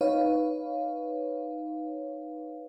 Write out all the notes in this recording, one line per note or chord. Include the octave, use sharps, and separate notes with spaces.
D#4 B4 C#5 F5